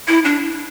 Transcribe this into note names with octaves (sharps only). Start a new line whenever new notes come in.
E4
D4